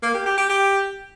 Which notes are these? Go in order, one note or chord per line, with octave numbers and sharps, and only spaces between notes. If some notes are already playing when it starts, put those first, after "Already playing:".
A#3
G4
G4
G4
G4